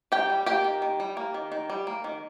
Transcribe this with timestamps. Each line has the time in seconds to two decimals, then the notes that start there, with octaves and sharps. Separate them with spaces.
0.12 D#3 G4 G5
0.30 G3
0.46 A#3 G4 G5
0.64 D#3
0.82 D#3
1.00 G3
1.17 A#3
1.34 D#3
1.52 D#3
1.70 G3
1.87 A#3
2.04 D#3